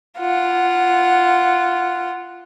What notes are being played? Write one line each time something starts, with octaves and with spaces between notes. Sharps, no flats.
F4 F#5